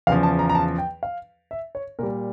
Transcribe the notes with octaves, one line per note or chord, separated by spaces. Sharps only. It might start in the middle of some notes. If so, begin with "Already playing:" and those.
E2 C#3 F3 F5
A5
A#5
A#5
A5
G5
F5
E5
C#5
A#2 G3 A#4